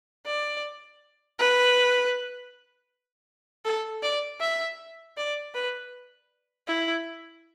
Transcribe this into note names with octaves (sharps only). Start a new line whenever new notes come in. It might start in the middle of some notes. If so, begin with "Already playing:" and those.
D5
B4
A4
D5
E5
D5
B4
E4